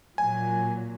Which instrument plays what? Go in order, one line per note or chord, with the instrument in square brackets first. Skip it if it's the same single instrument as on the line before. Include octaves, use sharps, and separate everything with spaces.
[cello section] A#2 F#3 [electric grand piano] G#5